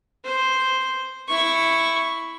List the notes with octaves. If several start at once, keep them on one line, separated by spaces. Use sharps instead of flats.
C5
E4 C#6